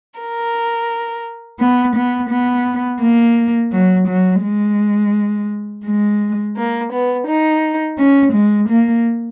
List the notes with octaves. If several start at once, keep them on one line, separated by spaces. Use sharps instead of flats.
A#4
B3
B3
B3
A#3
F#3
F#3
G#3
G#3
A#3
B3
D#4
C#4
G#3
A#3